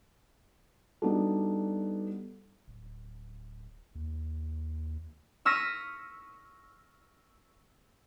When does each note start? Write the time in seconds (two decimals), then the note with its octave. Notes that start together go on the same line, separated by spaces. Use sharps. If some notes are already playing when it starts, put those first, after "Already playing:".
1.02 G3 B3 D4 D#4 F#4 A4
2.68 D1
3.95 D#2
5.45 C#6 E6 F6 A#6 B6 D#7